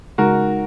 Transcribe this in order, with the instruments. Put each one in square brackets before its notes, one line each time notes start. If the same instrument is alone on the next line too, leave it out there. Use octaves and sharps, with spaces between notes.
[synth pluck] C#3 G#3 D#4 [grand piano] F#4 A#4